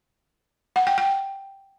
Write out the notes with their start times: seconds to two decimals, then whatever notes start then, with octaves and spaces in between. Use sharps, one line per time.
0.76 F#5
0.87 G5
0.98 G5